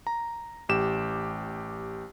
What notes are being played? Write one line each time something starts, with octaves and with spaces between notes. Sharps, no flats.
A#5
A1 G4 E7